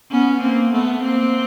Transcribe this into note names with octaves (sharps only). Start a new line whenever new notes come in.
B3 C#4
A#3 C4
A3 B3
A#3 C4